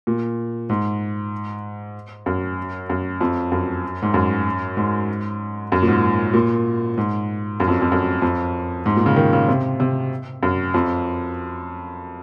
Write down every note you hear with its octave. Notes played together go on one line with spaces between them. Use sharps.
A#2
G#2
F#2
F#2
F2
F#2
G#2
F#2
G#2
F#2
A#2
G#2
A#2
G#2
F#2
F2
F2
F#2
F2
G#2
A#2
C#3
D#3
C#3
C3
C3
F#2
F2